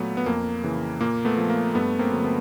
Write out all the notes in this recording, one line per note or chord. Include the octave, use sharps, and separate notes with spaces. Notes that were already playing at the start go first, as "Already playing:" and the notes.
Already playing: A#2 F#3 A3 B3
B3
F2 A#3
C#3 E3
A#2 A#3
A3 B3
F3
A#3
G2 A3 B3
A#3 C4
D3 F#3
A3 B3